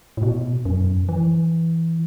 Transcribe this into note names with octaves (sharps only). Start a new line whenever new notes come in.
A2
B2
F#2
E3